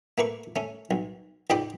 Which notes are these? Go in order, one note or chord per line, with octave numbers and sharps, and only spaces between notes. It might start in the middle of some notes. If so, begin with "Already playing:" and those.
A3 A#3 B4 C#6
A3 C#4
B1
C#2 G#2 D5 D#5 G5 B5